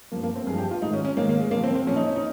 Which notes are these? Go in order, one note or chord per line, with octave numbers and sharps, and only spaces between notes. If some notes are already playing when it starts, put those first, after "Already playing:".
G2 F3 A#3
A#3
C4
G2 F3 G#4
G4
F4
G#2 D#3 D#4
C#4
C#4
G#2 D#3 A#3
A#3
G#3
A#2 F3 A#3
C4
C4
A#2 F3 C#4
D#4
C#4
D#4